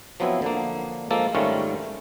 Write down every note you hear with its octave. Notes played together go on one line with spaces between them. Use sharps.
F3 F#3 B3 C4 E4
D3 F3 A#3
F3 G#3 A#3 A4
G#2 D#3 G3 A3 C#4 F4